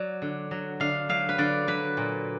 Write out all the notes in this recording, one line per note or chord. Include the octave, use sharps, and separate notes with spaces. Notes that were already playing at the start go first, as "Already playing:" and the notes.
Already playing: F#3 D5
D3
F#3
D3 F5
F#3 F5
B4
D3 D5
F#3 B4
A#2